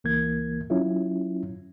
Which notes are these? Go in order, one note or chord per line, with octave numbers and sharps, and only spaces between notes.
C#2 E3 A#3 G#6
F#3 C#4 E4 F4